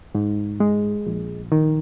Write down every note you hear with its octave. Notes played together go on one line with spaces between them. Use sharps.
G#2
G#3
A#1
D#3